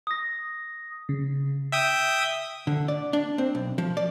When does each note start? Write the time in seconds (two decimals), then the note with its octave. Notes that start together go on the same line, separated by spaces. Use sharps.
0.07 D#6 A#6
1.09 C#3
1.72 E5 G5 D#6
2.67 D3
2.88 D5
3.13 D4
3.38 C4
3.55 B1
3.78 F3
3.97 D5